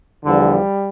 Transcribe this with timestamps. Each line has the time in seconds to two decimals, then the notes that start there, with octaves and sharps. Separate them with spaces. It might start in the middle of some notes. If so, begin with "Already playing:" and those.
0.25 E2 D3 F3 G3